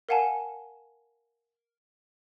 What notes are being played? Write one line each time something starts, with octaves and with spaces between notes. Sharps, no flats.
A#4 F5 F#5 G#5 A5